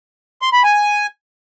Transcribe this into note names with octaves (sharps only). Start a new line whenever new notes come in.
C6
B5
G#5